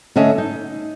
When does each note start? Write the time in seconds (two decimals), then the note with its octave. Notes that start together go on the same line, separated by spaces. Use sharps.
0.16 D3 A3 C#4 D#5 E5
0.38 D#4